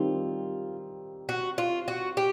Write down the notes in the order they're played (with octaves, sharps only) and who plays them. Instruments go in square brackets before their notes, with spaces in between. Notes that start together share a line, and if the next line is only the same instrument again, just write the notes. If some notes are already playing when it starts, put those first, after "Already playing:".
Already playing: [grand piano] D#3 G3 C4 D#4 [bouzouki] F4
[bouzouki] F#4
F4
F#4
G4